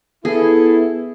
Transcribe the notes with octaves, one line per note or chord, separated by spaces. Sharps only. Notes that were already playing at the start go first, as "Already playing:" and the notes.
B3 E4 G#4 A4